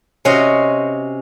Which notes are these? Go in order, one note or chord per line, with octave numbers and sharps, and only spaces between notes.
C3 C#4 F#4 C5 D#5